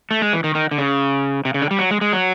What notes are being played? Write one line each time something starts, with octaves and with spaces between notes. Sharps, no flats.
A3
G#3
E3
D#3
D#3
D3
C#3
C3
C#3
D3
G3
F#3
G#3
G#3
F#3